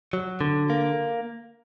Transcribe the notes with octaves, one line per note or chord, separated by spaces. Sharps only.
F#3
D3
A#3